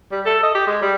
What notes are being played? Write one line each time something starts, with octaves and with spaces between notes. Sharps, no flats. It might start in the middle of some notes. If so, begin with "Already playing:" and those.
G3
A4
D#5
G4
G#3
G3